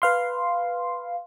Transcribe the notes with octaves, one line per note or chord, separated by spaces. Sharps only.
B4 F5 C6